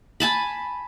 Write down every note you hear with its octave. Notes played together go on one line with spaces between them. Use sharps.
G#5 A5 B5